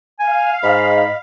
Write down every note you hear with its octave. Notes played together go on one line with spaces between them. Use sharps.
F5 G#5
G#2 D#5 B5